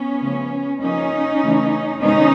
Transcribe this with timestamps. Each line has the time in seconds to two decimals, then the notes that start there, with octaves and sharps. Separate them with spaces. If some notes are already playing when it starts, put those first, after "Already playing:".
Already playing: B3 C#4
0.22 C#3 F3 A3
0.81 C#3 F3 A#3 C#4 D#4
1.41 C#3 E3 A3
2.00 C3 D#3 G#3 B3 C#4 D#4